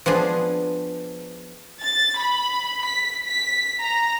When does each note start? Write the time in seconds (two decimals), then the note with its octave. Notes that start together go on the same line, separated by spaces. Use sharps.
0.06 F3 B3 D4 G#4
1.82 A6
2.19 B5
2.84 B6
3.25 B6
3.80 A#5